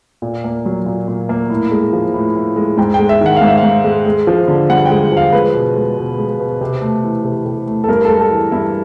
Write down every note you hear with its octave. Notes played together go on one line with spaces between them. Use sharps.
A#2
A#3
F#3
A#2
A#2
A#3
A2
G#3
F3
A2
A2
G#3
G#2 G5
G#3 G5
E5
D#3 F#5
G#2 F5
E5
F5
G#2
G#3
G#3
F3
D3
G2 F#5
G#3 G5
F3 F5
G#3 B4
B2
G#3
B2
G#3
B2
C3
A3
E3
C3
C3
A3
A4
G2 A#4
G#3 A4
A4
E3
G2 E4